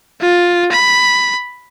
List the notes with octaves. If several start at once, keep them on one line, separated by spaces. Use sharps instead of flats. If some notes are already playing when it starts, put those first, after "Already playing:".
F4
B5